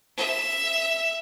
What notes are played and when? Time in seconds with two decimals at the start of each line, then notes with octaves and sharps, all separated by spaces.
0.17 E5